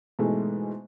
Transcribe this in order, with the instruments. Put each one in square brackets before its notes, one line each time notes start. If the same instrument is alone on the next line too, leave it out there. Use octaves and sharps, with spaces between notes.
[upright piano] G#2 B2 E3 G#3 A3